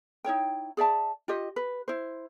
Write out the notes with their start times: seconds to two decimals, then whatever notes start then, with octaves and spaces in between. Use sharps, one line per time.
0.25 D#4 E4 C#5 G5
0.77 G#4 D5 E5 A5
1.28 F4 G4 D#5
1.56 B4
1.88 E4 C5